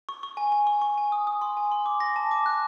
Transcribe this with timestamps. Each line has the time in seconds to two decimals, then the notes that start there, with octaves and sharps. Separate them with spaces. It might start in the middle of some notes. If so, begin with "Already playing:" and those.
0.09 C#6
0.23 C#6
0.37 G#5
0.52 G#5
0.67 C#6
0.82 C#6
0.98 G#5
1.12 D#6
1.27 D#6
1.41 C6
1.57 G#5
1.72 C6
1.86 D6
2.00 A#6
2.16 A5
2.31 D6
2.46 F#6